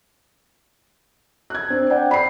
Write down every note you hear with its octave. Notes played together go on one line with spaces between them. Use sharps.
F#6 G#6
C4 D4
D5 F#5 G5
B5 C7